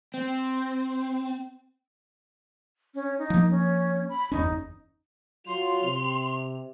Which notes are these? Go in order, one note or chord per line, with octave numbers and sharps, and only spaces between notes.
C4
C#4
D#4
F3 A#3
C#4
B5
F#1 E2 C#4 D#4
F#3 F4 C6 F7
C3